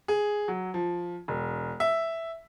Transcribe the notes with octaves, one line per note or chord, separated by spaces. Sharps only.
G#4
F#3
F3
E1
E5